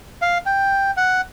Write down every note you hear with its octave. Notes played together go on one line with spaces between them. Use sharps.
F5
G5
F#5